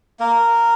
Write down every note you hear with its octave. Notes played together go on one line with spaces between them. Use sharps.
A#3 A#4